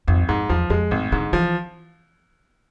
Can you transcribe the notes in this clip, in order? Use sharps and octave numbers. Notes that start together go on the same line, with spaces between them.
G#1 F2
F2 G#2
E2 F3
F2 G#3
G#1 A2
G#2 D3
E3 F3